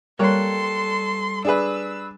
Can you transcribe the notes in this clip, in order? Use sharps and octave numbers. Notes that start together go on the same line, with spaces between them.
G3 A#3 A4 C#5 C6 F#6
D4 G#4 B4 E6